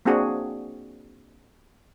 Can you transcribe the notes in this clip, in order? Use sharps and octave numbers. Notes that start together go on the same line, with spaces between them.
A#3 C4 D4 F#4 G#4 F#5